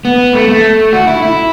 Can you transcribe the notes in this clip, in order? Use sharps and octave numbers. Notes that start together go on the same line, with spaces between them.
B3
A3
A3
F#4
E4
E4